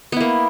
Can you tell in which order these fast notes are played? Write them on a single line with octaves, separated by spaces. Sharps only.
B3 E4 A#3